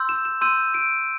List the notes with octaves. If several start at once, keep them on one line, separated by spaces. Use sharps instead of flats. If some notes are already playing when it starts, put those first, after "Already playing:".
Already playing: C6 E6 G6
E7
E7
C6 E6 G6 D#7
D7